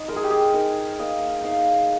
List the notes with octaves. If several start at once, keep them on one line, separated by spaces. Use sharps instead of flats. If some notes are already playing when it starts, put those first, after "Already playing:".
Already playing: D#4
G#3 A#4
G#4
G4
G#4
D#4 A#4
A#3 D#5
D#4 F5